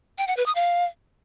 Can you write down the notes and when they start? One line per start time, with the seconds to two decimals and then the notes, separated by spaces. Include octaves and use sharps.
0.18 G5
0.27 F#5
0.37 B4
0.46 D#6
0.55 F5